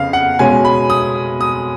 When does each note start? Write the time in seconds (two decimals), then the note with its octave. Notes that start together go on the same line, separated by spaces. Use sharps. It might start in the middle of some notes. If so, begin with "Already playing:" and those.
Already playing: F2 C#3 B3 F5
0.13 F#5
0.39 B2 G#3 C#4 G#5
0.65 B5
0.90 D#6
1.41 D#6